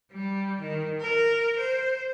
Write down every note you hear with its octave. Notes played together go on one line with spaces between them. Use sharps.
G3
D#3
A#4
C5